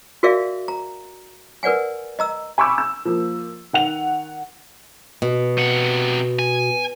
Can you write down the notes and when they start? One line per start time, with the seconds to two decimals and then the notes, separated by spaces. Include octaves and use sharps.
0.23 F#4 G#4 A#4 D5 E5 F5
0.68 A#5
1.63 A#4 B4 D5 F#5 G#5
2.19 D#5 A#5 E6
2.58 G#5 B5 C#6 D6 E6
2.78 E6
3.05 F3 A#3
3.73 D#3 F#5 F7
5.22 B2
5.58 C3 F#5
6.39 G#5